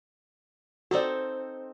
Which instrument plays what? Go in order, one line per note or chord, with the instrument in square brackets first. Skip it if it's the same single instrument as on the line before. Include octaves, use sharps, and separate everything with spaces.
[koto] C4 D#4 A4 [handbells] F#4 D5